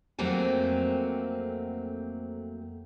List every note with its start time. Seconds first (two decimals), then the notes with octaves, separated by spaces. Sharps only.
0.19 F2 F#3 A3 A#3 C4 G#5